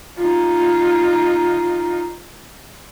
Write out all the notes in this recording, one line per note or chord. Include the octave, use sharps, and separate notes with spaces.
D#4 F4